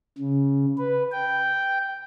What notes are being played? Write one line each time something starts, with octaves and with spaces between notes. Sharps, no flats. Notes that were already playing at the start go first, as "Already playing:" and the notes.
C#3
B4
G5